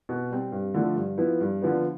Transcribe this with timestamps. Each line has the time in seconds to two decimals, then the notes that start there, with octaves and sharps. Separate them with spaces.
0.09 B2
0.30 G3 C4
0.52 G2
0.74 D3 F3 A3
0.96 G2
1.18 F3 B3 E4
1.40 G2
1.62 D3 F3 B3